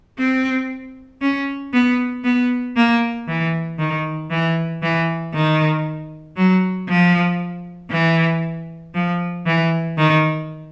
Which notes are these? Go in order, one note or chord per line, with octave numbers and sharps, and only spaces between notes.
C4
C#4
B3
B3
A#3
E3
D#3
E3
E3
D#3
F#3
F3
E3
F3
E3
D#3